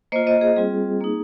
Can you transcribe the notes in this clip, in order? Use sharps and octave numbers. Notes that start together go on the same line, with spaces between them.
A#3 F4 C5 D#5
C5 D#5
G#4 C5
G3 C4 F4 G#4
A#3 D#4